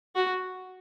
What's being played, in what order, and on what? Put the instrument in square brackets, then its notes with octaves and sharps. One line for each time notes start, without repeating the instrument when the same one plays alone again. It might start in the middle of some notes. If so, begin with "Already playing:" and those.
[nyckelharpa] F#4